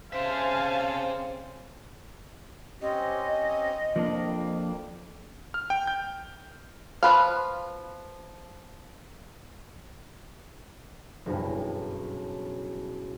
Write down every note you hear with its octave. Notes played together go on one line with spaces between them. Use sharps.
C#3 C4 C5 E5 F5 G#5 A5
C4 C#4 G4 D#5
F2 F3 A#3 D4
F6
G5
G6
F3 B4 F5
F#1 B1 G2 E4